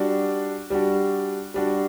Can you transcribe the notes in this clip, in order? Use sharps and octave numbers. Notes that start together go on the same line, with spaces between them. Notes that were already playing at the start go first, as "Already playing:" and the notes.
Already playing: G3 D4 F#4
G3 D4 F#4
G3 D4 F#4